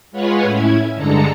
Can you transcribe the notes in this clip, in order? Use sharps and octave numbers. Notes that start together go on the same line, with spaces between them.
G#3 F4 B4 C#5 F#5 G#5
A2 C#4 E4 G#6
G2 D3 G#3 A4 A#5 C#7